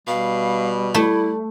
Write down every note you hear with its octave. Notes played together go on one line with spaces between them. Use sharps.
B2 G3 F5
A3 E4